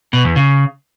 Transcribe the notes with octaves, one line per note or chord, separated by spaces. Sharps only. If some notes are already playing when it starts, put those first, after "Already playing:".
B2
E2
C#3